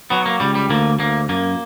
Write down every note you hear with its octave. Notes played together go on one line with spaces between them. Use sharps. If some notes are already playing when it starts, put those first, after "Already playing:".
F#3 B3
A#3
C#2 G3
G3
D2 A#3
D2 A#3
F#2 A#3